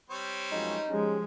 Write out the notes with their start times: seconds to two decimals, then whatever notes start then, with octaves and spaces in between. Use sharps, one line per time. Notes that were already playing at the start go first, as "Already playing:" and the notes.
0.10 G3 C4 C#5
0.52 F#2 F3 G#3 D#4
0.89 F3 G#3 C#4 G4 G#4